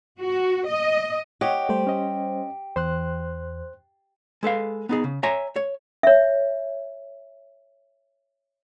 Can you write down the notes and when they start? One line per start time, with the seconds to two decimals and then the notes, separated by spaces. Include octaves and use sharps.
0.21 F#4
0.67 D#5
1.41 G4 C#5 D#5 F#5
1.69 G3 A3 C5
1.87 C#4 D#5
2.76 E2 C5 C6 F#6
4.43 G#3 A4 B4 F5
4.89 B3 D#4 G#4
5.04 C#3
5.23 C#5 E5 G#5 A#5
5.56 C#5
6.03 C#5 E5